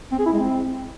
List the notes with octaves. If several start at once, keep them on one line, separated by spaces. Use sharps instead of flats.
C4
G#4
E4
G#3
C4